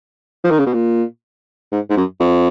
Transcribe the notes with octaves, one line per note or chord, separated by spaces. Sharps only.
F3
D#3
C#3
B2
A#2
G#2
G#2
F#2
F2